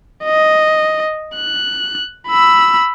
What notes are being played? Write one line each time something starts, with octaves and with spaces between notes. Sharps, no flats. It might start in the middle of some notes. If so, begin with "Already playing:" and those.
D#5
F#6
B5 E6